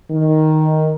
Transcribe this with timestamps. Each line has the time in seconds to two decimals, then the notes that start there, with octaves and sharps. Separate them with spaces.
0.11 D#3